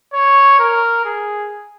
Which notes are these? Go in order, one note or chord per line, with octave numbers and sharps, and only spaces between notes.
C#5
A#4
G#4